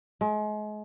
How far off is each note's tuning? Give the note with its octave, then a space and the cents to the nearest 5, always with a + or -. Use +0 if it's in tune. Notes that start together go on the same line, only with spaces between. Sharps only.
G#3 +35